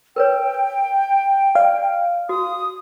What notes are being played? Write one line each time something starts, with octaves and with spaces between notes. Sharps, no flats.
A#4 B4 C#5 G5
D5 F5
F#4 D#6